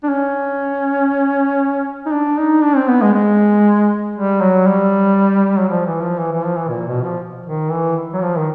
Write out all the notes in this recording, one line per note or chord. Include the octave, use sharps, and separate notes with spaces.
D4
C#4
D#4
D4
D#4
D4
C4
B3
G#3
G#3
G3
F#3
G3
F#3
F3
E3
F3
E3
E3
F3
E3
A#2
B2
F3
D#3
E3
F#3
F3
D#3